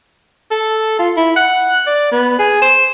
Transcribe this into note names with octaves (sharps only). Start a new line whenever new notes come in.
A4
F4
E4
F#5
D5
B3
G#4
C5